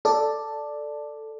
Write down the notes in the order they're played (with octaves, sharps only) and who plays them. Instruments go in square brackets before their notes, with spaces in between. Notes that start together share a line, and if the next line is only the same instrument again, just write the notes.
[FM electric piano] A4 D5